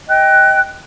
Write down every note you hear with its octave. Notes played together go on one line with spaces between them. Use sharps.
D#5 G5 F#6